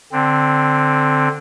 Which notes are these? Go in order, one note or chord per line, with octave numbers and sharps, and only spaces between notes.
D3 C4